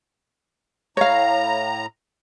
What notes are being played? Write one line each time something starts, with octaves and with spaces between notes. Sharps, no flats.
A2 C#5 F5 A#5